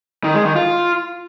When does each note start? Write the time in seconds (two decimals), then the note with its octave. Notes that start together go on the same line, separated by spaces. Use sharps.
0.24 D#3
0.35 G#3
0.45 D#3
0.56 F4